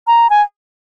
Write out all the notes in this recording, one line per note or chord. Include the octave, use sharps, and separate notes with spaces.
A#5
G#5